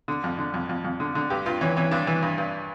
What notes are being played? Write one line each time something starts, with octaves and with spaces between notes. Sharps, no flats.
D3
F2
D3
F2
F2
F2
D3
D3
G2 G4
G2 F4
E3 C#4
E3 C#4
G2 D4
E3
G2
G2